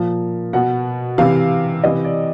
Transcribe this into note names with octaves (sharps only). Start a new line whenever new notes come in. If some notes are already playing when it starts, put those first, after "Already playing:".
Already playing: A#2 F3
B2 F#5
C3 E3 F5
C3 E3 D#5
D5